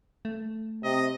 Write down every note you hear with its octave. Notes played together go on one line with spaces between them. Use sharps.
A3
C3 D#5